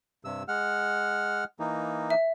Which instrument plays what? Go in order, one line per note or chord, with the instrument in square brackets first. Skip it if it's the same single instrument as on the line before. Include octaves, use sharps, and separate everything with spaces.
[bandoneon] G2 C3 E6
G#3 F#5 F6
E3 A#3 D#4
[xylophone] E5